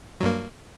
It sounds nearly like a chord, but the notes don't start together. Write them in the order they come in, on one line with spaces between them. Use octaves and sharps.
F#3 G2 A#3